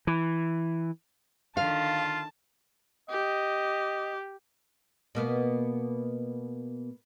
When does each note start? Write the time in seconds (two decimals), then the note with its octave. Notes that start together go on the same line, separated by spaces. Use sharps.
0.07 E3
1.57 D3 D#3 F4 F5 A5
3.10 G4 D#5
5.15 B2 A#3 B3